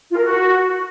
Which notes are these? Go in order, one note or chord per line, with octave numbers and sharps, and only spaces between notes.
F4
A#4
F#4